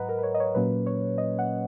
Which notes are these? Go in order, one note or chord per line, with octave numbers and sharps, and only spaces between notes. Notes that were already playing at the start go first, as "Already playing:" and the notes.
Already playing: G#2 F#3 B4 D#5 F#5 A#5
A#4
B4
C#5
D#5
C#5
A#2 F#3 A#3 C#4 B4
C#5
D#5
F#5